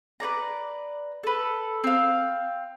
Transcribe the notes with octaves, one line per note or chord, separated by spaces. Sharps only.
B4 C#5 D5 A#5
A4 B4
C4 F5